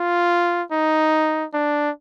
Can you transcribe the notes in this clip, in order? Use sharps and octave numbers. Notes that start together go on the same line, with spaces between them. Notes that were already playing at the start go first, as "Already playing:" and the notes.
Already playing: F4
D#4
D4